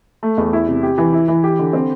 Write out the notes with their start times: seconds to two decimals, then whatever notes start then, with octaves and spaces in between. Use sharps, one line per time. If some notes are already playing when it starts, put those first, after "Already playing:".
0.23 A3
0.38 E2
0.53 E4
0.68 C3
0.83 G4
0.98 E3
1.13 E4
1.28 E3
1.44 G4
1.59 D3
1.73 C4